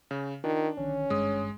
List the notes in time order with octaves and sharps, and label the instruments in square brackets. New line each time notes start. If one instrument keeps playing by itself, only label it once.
[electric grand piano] C#3
[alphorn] D#3 [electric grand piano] D4 [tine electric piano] F4
[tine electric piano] B1 D3 D#3 [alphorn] C#4
[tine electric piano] G#1 G2 D#6 [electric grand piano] G#3